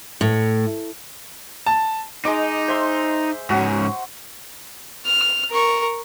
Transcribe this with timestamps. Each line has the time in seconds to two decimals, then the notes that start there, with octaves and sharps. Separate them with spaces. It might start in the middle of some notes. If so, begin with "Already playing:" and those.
0.21 A2
1.66 A5
2.25 G#3 D#4 D#5 D6
2.68 C5 E5 C6
3.50 G#2 C#4 F#4
5.05 F6
5.51 A#4 C#6